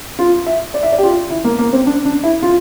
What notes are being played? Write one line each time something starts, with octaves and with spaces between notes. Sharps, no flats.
F4
E5
D5
E5
D5
G4
F4
E4
A#3
A#3
C4
D4
D4
E4
F4